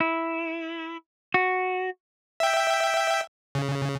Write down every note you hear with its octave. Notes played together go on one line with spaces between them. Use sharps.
E4
F#4
E5 G5
C#3